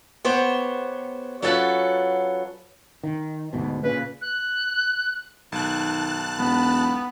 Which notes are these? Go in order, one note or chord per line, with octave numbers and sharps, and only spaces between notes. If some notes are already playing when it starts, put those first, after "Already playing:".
B3 G4 C5 C#5
F#3 C#4 F4 A4 B4 F#5
D#3
D2 G#2 B2
A#2 C#3 B4
F#6
B1 D#3 A5 F#6
E1 B3